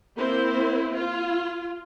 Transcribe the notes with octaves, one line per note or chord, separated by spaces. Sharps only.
A#3 C4 E4 C5
F4